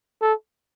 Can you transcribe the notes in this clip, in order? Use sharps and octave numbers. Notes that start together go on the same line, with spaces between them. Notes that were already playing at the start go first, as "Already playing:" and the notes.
A4